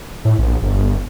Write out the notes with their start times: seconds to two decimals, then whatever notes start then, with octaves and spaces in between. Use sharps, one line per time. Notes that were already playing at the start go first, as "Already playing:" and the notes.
0.25 A2
0.39 A#1
0.63 G1